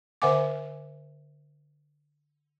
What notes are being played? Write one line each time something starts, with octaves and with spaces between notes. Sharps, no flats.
D3 C5 E5 F#5 G#5 D6